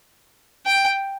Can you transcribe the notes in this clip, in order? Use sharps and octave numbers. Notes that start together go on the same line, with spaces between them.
G5